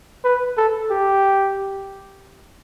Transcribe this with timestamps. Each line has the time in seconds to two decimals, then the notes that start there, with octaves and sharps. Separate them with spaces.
0.25 B4
0.57 A4
0.91 G4